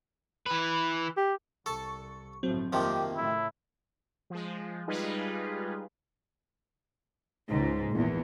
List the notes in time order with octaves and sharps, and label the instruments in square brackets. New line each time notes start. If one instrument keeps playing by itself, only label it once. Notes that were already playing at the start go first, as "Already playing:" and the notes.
[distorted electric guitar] E3 B4
[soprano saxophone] G4
[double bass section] C2 [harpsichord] A4 A5 [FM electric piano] C#6
[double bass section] G1 A2 F3 [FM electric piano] F#3 C4
[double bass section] F2 A#3 [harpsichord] C3 D#3 F3 [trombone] G4
[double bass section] A2 C#3 A3 [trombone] E4
[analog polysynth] F3 G#3
G3 G#3 D#4 F4 G#4 B4
[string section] C#2 G#2
A#1 E2